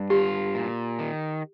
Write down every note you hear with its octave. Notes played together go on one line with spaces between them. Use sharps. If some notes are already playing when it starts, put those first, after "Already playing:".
Already playing: G2
F4 G4
A#2
D#3